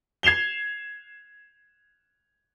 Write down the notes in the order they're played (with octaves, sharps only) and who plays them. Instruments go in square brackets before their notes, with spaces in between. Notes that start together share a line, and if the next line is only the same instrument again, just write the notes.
[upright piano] G#6 C7 E7 F7 G7